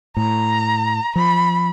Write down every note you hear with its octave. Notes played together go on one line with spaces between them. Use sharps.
A2 A#5
F3 B5